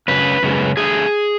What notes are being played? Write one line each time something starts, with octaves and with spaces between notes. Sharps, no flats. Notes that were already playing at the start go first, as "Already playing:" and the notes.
F#2 C#3 B4
F#2 C#3 G#3 B3
D3 A3 G#4